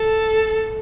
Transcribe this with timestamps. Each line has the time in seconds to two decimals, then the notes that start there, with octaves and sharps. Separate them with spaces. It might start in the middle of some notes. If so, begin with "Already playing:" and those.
Already playing: A4